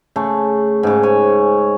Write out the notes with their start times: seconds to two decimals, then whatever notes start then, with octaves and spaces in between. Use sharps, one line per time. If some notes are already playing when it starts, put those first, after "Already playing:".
0.16 C#3 A3
0.83 G#2 C#3
1.03 C#5 G#5